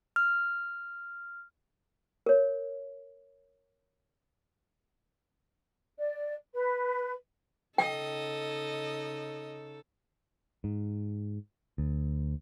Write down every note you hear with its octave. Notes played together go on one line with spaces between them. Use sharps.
F6
A#4 C#5
D5
B4
C#3 D#4 A4 D#5 G5
G#2
D2